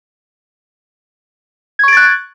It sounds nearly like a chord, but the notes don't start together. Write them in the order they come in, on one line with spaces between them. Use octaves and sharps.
G#6 C#6 D7 A6 F#6